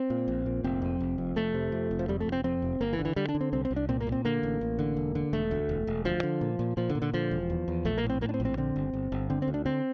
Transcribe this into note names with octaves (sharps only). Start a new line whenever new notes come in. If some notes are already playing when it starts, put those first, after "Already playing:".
Already playing: C4
A#2
A#1
A#2
F1 C4
F2
F1
F2
F1 A3
C3
F2
F1
F3
F2 G3
A3
F1
C4
F2 C4
F1
G1 A#3
E3
D3
E3
D3 G3
D4
D3
C4
C2 C4
C4
C2
D4
A#2 C4
A#3
A#2
C4
D3 A#3
A1
A1
D3
E1
D3
E1 A3
D2
E1
E1
D2 F3
D3
A#2
A#2
A#2 F3
D3
A#2
D3
D3 F3
E1
E2
E2
A#1 A3
A#3
A2
C4
A2 A#3
D4
C4
A#1
C4
D3 C4
G1
G1
G1
D3 C4
C4
D2
D4
D3 C4